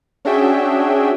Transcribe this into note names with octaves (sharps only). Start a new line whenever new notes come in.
C#4 D4 F#4 G#4 E5 G5